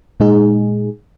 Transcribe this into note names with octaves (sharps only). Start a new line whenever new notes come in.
A#2 G#3 D#4 G#4